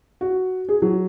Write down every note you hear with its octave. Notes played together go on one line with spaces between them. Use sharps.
F#4
G#4
F#3